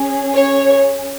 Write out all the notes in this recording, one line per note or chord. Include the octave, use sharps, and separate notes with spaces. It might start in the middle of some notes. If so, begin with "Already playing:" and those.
Already playing: C#4 G#4
C#5